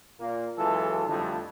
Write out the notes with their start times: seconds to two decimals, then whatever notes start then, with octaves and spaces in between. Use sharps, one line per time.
0.20 A#2 A#3
0.58 F#2 E3 G#3 F4 A4
1.06 F2 D3 G3 A3